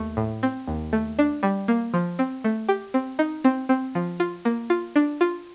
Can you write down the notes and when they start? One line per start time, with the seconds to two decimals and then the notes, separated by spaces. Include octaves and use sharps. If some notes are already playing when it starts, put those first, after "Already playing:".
Already playing: D#2 A3
0.17 A2
0.43 C4
0.67 D#2
0.93 A3
1.19 D4
1.43 G3
1.68 A#3
1.94 F3
2.19 C4
2.44 A3
2.68 G4
2.94 C4
3.19 D#4
3.44 C4
3.69 C4
3.95 F3
4.20 F4
4.45 A#3
4.70 F4
4.96 D4
5.21 F4